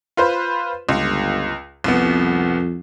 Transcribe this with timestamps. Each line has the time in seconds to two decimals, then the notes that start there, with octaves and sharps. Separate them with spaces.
0.17 F4 B4 C5
0.89 G1 C#2
1.84 C2 F2 B3